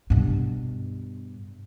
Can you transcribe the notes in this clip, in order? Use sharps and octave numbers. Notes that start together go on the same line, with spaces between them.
G2 B2